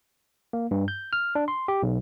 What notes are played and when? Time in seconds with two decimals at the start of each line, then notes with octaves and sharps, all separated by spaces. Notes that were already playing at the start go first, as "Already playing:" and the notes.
0.53 A#3
0.71 G2
0.88 G6
1.13 F6
1.35 D4
1.48 C6
1.68 G4
1.83 B1